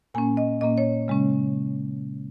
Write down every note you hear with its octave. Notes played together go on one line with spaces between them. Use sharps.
A#2 A#3 C#4 G#5
D#5
A#2 A#3 C#4 D#5
C#5
C#3 G#3 C#4